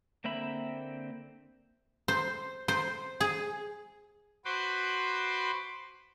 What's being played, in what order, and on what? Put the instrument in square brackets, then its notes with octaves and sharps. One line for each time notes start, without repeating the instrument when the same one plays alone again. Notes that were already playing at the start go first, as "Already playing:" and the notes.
[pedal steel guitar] D3 A#3 C4 E5 B5
[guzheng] C5
C5
G#4
[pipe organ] F#4 B4 C5 B5 C6 D6